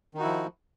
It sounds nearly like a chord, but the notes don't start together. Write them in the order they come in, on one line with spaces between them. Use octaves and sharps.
D#3 D#4 F#4 E4 F3